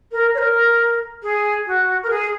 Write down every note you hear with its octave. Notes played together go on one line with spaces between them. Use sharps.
A#4
C#5
A#4
G#4
F#4
A#4
G#4